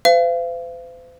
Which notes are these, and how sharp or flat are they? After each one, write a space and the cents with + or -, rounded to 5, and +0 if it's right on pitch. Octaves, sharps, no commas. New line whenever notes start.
C5 -45 F5 -35